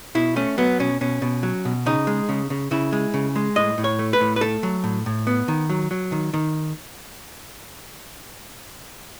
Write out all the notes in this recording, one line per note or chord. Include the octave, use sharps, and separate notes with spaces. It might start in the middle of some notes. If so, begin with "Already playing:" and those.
B2 E4
A3 C#4
F#3 B3
B2 C#4
B2 C#4
B2
F#3
B2
C#3 D#4
G#3
C#3
C#3
C#3 E4
G#3
C#3
G#3
A2 D#5
A2
C#5
A3
B4
A2
B4
A3 A4
F#3
A2
A2
B3
D#3
F#3
F#3
D#3
D#3